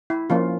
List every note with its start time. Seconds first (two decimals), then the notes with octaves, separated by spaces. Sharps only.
0.10 E4
0.30 F3 A#3 C#4 F4